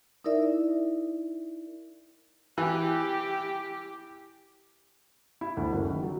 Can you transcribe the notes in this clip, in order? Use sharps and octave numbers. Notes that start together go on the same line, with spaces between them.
D#4 E4 A#4 D5 E5
E3 G4
E4
D2
F#1
D#3
F#3